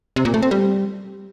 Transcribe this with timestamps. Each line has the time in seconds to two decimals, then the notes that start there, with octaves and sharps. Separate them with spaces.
0.16 C3
0.25 A#2
0.34 A3
0.42 C4
0.51 G3